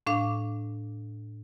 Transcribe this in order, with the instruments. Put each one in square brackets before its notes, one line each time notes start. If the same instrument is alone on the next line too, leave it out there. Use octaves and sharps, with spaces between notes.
[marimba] A2 D4 F5 D6